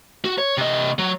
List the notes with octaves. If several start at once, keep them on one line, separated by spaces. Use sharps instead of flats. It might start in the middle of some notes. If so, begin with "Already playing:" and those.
F#4
C#5
C3 D#5
F#3